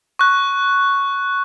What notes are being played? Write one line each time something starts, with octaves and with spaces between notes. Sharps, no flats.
C#6 F#6